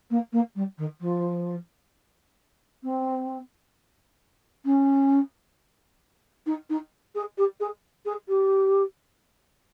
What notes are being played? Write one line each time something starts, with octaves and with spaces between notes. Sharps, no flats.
A#3
A#3
G3
D#3
F3
C4
C#4
D#4
D#4
G#4
G4
G#4
G#4
G4